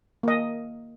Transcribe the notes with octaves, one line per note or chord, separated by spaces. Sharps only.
A#3 D#5